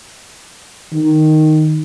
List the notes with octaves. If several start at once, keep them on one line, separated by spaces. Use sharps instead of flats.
D#3